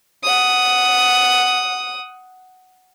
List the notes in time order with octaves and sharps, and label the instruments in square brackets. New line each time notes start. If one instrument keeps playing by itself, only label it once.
[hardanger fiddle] F#5 D#6